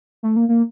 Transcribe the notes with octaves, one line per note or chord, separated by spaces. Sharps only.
A3
A#3
A#3